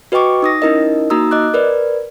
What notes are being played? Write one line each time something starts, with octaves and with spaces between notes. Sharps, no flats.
F#4 B4 D#5 G5 C#6 D6
D#4 D#6 A#6
C#4 D#4 E4 A#4 D#5
A#3 D#4 F#4 A#5 D#6 E6
D#5 D6 F#6
A#4 B4 D5